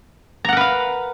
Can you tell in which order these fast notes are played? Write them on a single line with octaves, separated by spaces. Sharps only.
A#5 F#5 A#4 B4 F5